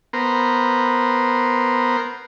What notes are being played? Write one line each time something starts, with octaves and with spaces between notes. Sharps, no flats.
B3 A#4 C5